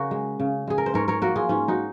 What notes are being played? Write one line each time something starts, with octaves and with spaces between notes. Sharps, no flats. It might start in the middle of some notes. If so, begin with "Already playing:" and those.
Already playing: C#3 F#4 A#4
G#3
C#3
G#3 G#4
A#4
C5
G#2 A#4 C#5
A#4 C#5
F3 A#3 F#4 A#4
F4 G#4
G#2 C#4 F4
D#4 F#4